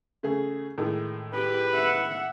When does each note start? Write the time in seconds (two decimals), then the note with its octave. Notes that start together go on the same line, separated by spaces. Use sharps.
0.23 C#3 A3 G#4
0.78 A2 D#3 G#3
1.33 G4 B4
1.74 E5 F#5